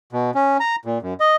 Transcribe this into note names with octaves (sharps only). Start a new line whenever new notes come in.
B2
C#4
A#5
A#2
F#2
D#5